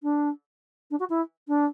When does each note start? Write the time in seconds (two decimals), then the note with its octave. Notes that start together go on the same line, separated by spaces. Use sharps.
0.03 D4
0.91 D4
0.99 F#4
1.09 E4
1.48 D4